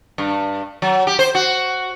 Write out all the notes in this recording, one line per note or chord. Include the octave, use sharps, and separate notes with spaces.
G2
F#3
G4
C5
F#4